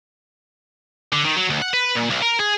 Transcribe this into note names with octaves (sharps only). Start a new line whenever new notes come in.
D3
D#3
F#3
D2
F#5
B4
A#2
B1
A#4
G#4